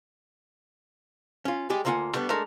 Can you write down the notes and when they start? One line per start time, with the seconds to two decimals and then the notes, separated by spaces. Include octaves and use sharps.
1.45 C#4 F4
1.70 G3 G#3 G4 G#4
1.85 D2 A#3 F4 E5 F#5 G#5
2.14 G3 A3 B3 D4
2.30 G#3 A3 D4 A#4